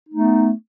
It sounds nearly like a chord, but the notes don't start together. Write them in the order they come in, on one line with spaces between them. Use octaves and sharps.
D#4 A3 B3